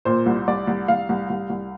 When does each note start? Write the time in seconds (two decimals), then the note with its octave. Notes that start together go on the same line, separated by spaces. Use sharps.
0.05 A#2 C5
0.26 C2
0.48 C2 D5
0.67 C2
0.88 C2 F5
1.09 C2
1.30 C2
1.50 C2